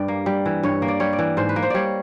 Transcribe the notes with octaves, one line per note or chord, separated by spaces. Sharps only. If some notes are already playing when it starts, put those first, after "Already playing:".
Already playing: G2 G3 D5
A#3
G3
E3
G2 C#5
A#3
D5
G3 C#5
D5
E3
G#2 C5
B4
A#3
C5
G3 C#5 D5